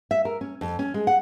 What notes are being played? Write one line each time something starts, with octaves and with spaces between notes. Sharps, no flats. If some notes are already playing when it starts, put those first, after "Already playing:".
E5
A#4
C#4
F2
C#4
G#3
F#5